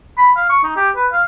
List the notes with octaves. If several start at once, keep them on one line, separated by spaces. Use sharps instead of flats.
B5
F5
C#6
D#4
G4
B4
F5